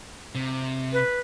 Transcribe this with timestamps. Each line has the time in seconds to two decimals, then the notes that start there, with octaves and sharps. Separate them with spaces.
0.35 C3
0.93 B4